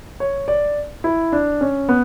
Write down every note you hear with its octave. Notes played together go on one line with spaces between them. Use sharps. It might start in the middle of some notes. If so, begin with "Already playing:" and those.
C#5
D5
E4
D4
C#4
B3